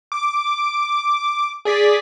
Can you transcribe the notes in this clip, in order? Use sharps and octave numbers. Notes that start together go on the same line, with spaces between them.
D6
G#4 D5 B6